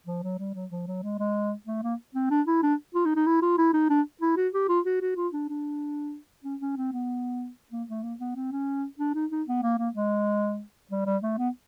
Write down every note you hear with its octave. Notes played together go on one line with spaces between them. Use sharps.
F3
F#3
G3
F#3
F3
F#3
G#3
G#3
A3
A#3
C4
D4
E4
D4
F4
D#4
D#4
E4
F4
E4
D#4
D4
E4
F#4
G4
F4
F#4
F#4
F4
D4
D4
C#4
C#4
C4
B3
A#3
A3
A#3
B3
C4
C#4
D4
D#4
D#4
B3
A#3
A#3
G#3
G3
G3
A3
B3